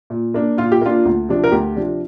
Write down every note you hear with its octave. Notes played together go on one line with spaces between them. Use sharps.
A#2
A#3 D4
A#2 F4
G4
A#3 D4 F4
D2
C3 F3 D4
A#4
D2 G4
C3 F3 D4